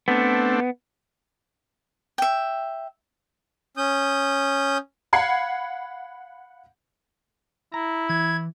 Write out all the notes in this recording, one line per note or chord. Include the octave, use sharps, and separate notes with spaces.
A3 B3 C4 D4
E5 G5
C#4 D#6 G6
F5 F#5 B5 G#6 C7 C#7
E4 A#5
E3 G#6